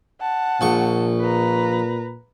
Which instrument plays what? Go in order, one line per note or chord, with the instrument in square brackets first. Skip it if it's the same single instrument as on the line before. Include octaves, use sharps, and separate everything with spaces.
[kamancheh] F#5 A5
[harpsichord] A#1 C#6 [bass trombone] A#2
[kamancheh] B4 A#5